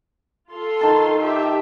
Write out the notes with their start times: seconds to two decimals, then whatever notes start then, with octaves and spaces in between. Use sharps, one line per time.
0.51 F4 A4 C6
0.81 D#3 A5
1.23 G4 E5